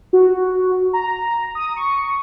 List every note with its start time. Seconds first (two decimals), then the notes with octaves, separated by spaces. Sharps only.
0.13 F#4
0.93 A#5
1.55 D#6
1.76 C#6